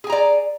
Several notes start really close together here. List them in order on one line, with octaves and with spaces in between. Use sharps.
G#4 G#5 A#5 D5